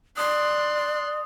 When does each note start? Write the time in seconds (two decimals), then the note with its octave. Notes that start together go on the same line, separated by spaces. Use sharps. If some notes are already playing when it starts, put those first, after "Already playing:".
0.17 D5 C6 D#6 F#6